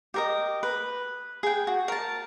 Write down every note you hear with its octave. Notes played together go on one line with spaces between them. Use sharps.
G4 A#4 D#5
B4
G#4 G5
F#4
A#4 A5